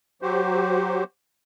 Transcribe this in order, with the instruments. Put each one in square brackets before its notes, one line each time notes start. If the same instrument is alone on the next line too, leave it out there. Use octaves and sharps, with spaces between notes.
[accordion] F#3 F#4 G4 C5